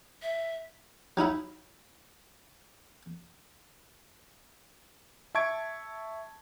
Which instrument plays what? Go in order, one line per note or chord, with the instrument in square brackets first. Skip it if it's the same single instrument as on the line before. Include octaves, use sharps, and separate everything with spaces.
[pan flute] E5
[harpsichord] F#3 D#4 E4 E5
[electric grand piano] E5 A5 C#6 G#6 D7